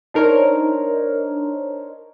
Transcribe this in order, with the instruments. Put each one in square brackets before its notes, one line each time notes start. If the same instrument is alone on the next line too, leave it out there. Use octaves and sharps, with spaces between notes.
[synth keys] D4 D#4 A#4 C5 C#5